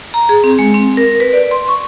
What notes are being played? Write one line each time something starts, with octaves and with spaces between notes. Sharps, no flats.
A#5
G#4
C4
G#3
C4
A#4
B4
D5
C6
C#6